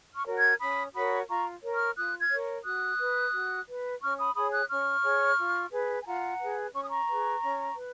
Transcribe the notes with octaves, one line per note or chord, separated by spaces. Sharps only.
C#6 F6
F#4 A#4 C#5
F6 G#6
C#4 B5 D#6
F#4 A#4 C#5 B5 D#6
F4 A#5 C#6
A#4 C#5
C#6 F6
F4 D#6 F#6
F6 G#6
A#4 C#5
F#4 D#6 F#6
B4
F#4
B4
C#4 C#6 F6
B5 D#6
G#4 C#5 B5 D#6
D#6 F#6
C#4 C#6 F6
G#4 C#5
F4
G#4 B4
G#5
F4 F#5 A#5
G#4 B4
C#4 C#6
D#6
A#5 C#6
G#4 B4
C#4
B4